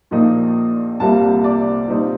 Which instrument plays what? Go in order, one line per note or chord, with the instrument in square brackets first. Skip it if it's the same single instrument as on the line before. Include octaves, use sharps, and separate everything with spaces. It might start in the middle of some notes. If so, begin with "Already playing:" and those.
[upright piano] A#1 A#2 F3 A#3 D#4
C2 C3 G3 A#3 F4 A5
D5
A#2 G3 C4 D#4